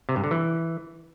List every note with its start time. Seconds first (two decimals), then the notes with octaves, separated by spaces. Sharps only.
0.09 C3
0.16 G2
0.24 D3
0.31 E3